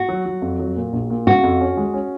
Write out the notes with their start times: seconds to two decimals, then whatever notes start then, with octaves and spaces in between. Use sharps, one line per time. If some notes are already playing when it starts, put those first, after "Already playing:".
Already playing: F#4
0.09 F#3
0.25 F#3
0.42 F2
0.59 F#3
0.76 A#2
0.93 A#1
1.10 A#2
1.27 C#3 F#4
1.43 F2
1.61 C#4
1.77 G#3
1.94 C#4